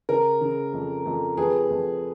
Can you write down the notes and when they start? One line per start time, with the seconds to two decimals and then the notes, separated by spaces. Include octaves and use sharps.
0.09 C#3 A#4
0.41 C#3
0.73 F2
1.06 F2
1.37 F2 G#4 B4
1.70 F2